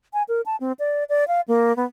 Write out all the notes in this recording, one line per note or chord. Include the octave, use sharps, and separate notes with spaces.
G#5
A#4
A5
C4
D5
D5
F5
A#3
B3